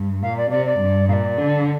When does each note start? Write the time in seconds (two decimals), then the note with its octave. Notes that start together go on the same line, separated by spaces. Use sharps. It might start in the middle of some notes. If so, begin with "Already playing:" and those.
Already playing: G2
0.22 A#2 F5
0.37 D5
0.51 C3 D5
0.66 D5
0.80 G2
1.09 A#2 F5
1.13 D5
1.38 D3